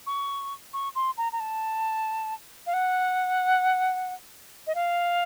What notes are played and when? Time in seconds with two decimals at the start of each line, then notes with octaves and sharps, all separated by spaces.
0.07 C#6
0.73 C#6
0.95 C6
1.18 A#5
1.32 A#5
1.40 A5
2.67 F5
2.73 F#5
4.67 D#5
4.75 F5